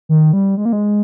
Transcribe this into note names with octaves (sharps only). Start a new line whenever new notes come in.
D#3
G3
G#3
A#3
G#3